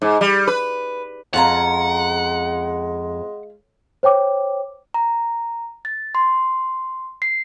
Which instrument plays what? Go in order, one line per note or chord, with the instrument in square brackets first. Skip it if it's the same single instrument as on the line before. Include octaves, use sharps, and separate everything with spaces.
[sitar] G#2
G3
B4
[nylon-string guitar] F2 [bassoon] G#3 [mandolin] C#4 F4 A#5 [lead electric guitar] F#5
[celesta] C5 C#5 G5 D6
[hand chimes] A#5
A6
C6
C7